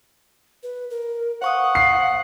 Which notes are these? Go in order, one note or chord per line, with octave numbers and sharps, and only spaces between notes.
B4
A#4
C5 F5 F#5 C#6 D#6
C7